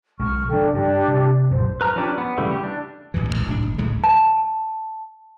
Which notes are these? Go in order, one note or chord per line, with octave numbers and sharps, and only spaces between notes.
B1 G#3 C#6 F6
C#3 F3 D4 A4 G5
G2 D4 G4 D5
C3
A#1 F#2 C5
B4 A#5 F6
F3 C#4 D4 G4 D5
B3
C#3 E3 G3 A3
G4
D4
A1 E2 G2 E3
D#1 A1 F2 G#3
B1 A2 D4
F#1
D2 A2 C#3 G#3
A5